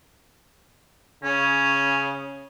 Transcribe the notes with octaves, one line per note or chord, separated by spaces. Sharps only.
C#3 C#4